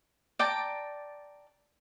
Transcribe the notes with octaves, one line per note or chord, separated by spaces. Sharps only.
D5 G5 A5 A#5